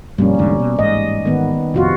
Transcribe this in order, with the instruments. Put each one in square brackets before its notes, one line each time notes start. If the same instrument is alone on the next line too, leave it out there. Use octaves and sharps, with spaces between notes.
[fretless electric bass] G2 B2 F3 [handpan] G3 A#3 C#4
[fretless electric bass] E2 G#2 D3
B2
[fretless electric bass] A1 G#2 [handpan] D#5
[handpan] D#3 B3
[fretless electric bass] A#1 F2 [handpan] C3 F4 F#4